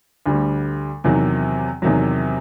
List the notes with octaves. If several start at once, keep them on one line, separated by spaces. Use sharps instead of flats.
D2 D3 G3
E2 C3 D#3 F#3
E2 C3 D#3 F#3